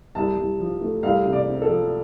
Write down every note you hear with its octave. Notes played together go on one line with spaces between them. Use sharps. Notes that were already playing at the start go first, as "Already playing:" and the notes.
C2 A5
C2
F3
A3
C2 F5
C3
D5
C4
A4
F3